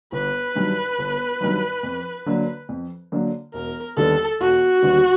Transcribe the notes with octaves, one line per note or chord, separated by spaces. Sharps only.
G1 B4
G2 D#3 F#3
G1
G2 D#3 F#3
F2
D3 F#3 A#3 D4
F2
D3 F#3 A#3 D4
E1 A#4
D#2 D3 G3 B3 A4
E1 F#4
D#2 D3 G3 B3